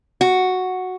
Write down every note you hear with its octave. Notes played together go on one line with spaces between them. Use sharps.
F#4